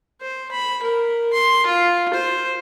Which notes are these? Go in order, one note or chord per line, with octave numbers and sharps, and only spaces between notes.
C5
B5
A#4
C6
F4
C5